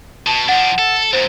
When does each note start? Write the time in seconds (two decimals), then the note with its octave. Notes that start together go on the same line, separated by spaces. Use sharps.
0.27 B2 A5
0.49 F3 D4 F#5
0.79 A4
1.13 F#2 A#2 C5